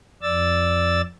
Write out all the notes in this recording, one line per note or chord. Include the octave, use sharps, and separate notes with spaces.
F2 D5 E6 A6